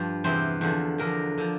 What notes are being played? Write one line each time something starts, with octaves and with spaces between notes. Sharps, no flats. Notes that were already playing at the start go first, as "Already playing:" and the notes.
Already playing: G2 F3
E2 C3 E3 C5
E2 D3 F3
E2 D3 F3 A#4
D3 F3